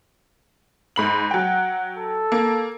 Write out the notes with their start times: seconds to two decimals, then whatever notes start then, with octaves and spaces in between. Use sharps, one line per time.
0.96 G#2 B5 F#7
1.31 F#3 F#5 G5
1.97 A4
2.32 A#3